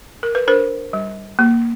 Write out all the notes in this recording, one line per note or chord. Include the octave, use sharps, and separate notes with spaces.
A#4
B4
D4 A#4 C5
G3
A#3